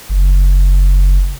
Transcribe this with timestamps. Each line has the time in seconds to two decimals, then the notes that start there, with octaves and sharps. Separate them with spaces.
0.09 F#1